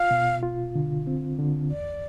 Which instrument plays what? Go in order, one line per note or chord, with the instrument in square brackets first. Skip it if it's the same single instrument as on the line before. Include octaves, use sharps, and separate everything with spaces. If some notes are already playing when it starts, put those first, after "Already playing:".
Already playing: [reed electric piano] F4 [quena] F5
[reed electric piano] B2
F4
D3
C4
D3
[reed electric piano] E2 [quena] D5